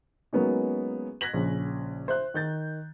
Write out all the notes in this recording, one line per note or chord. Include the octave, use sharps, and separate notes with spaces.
F#3 G#3 A#3 B3 C#4 D#4
F#6 G#6 A#6 B6 F#7
A#1 C#3
C5 E5 F#6
D#3 G6 A6